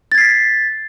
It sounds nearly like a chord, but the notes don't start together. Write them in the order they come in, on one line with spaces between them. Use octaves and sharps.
A6 G#6 C7 B6